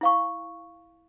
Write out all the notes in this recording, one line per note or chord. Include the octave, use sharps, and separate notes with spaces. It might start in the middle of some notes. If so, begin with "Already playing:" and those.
E4 F5 C#6